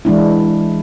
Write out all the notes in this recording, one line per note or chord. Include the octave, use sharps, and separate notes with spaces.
E3 G#3 D4 E4